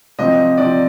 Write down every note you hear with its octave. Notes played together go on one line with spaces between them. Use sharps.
C3 F3 C4 D#5
C3 F3 C4 D5